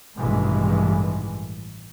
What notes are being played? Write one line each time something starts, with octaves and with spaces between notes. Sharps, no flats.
A1 G2 B2 D#3 E3 G#3